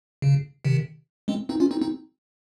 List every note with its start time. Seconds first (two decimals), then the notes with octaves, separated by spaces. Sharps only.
0.22 C#3
0.65 C3 D#3
1.28 G#3 C4
1.49 C4 D#4
1.60 C#4 F4
1.71 C4 D#4
1.81 C4 D#4